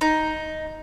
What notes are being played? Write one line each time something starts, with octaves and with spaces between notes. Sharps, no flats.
D#4